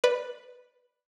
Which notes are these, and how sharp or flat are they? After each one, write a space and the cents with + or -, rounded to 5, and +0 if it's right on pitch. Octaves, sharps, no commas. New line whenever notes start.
B4 +0 D5 +0 B5 +0